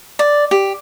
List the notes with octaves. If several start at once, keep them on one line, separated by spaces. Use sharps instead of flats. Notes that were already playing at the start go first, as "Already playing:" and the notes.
D5
G4